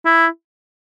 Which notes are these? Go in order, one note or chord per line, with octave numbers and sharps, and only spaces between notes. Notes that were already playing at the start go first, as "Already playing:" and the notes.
E4